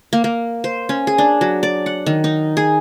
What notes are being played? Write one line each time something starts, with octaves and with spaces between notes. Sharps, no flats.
A#3
A#3
C5
C#4
G#4
D4
F#3
D5
F#5
D#3
D#4
G#4